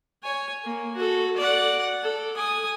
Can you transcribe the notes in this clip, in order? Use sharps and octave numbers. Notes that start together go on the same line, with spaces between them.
C#5 G#5
A#3
F#4 A4
D5 F#5
A4
G#5 D#6